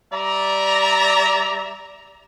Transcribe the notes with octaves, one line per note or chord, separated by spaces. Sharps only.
G3 D5 E5 A#5